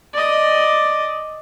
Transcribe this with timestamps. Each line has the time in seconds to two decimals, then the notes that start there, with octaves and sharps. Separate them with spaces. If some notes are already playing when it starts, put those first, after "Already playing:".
0.14 D5 D#5